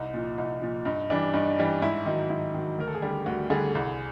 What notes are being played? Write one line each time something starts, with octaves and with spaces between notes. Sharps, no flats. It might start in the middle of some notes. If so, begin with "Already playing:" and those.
Already playing: C2 D#4
A#2 F3
C2 D#4
A#2 F3
G2 D#4
E3 G3 D4
G2 D#4
E3 G3
G#2 E4
D#3 F#3 D#4
G#2 E4
D#3 F#3
D2 A#4
A4
G#4
D3 G3 G4
D2 F#4
D3 G3 G#4
C2